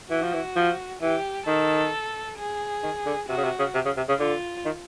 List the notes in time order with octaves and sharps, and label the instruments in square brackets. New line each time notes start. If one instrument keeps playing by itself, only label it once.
[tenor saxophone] E3 [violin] F#4
[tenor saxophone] F3
E3
F3
[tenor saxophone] E3 [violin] G4
[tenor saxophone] D#3 [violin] A4
[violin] G#4
[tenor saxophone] D#3
D3
[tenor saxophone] C3 [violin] F#4
[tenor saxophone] C#3
C3
C#3
C3
C#3
C3
C#3
[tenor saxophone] D3 [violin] F4
[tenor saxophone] D#3